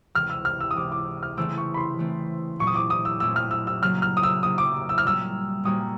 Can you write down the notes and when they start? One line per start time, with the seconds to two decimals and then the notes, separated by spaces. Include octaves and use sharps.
0.15 C#2 C3 E3 F6
0.30 E6
0.45 F6
0.61 E6
0.71 D#6
0.76 C#2 C3 E3 D6
0.92 D6
1.23 F6
1.37 C#3 E3 A3 C4 E6
1.58 C#6
1.74 B5
1.77 C6
1.98 C#3 E3 A3 C4
2.59 A#2 F#3 A3 C4 E4 C#6
2.67 D#6
2.76 D6
2.90 D#6
3.05 E6
3.20 A#2 F#3 A3 C4 E4 E6
3.36 F6
3.51 E6
3.67 E6
3.82 C#3 F#3 A#3 F6
4.02 F6
4.17 D#6
4.23 E6
4.43 C#3 F#3 A#3 D#6
4.58 D6
4.89 E6
4.98 F6
5.04 A#2 G3 A#3 C#4 F#4 E6
5.63 A#2 G3 A#3 C#4 F#4 D#6